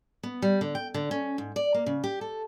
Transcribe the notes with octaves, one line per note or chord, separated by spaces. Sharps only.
B3
G3
D3
G5
D3
C#4
G#2
D5
A#3
C#3
G4
A4